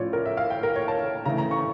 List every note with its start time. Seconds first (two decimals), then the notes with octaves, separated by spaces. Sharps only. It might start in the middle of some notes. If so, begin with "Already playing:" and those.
Already playing: A2 F3 C#4 F4 C#5 D5
0.13 A#4
0.26 E5
0.37 F5
0.50 G5
0.63 A#4
0.76 C#5
0.88 A5
1.25 C#3 E3 A3 A#5
1.38 A#5
1.51 C#6